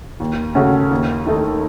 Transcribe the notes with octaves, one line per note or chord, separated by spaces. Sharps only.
D#2
C#3 A3 C#4 F#4
D#2
D#3 A3 D#4 A4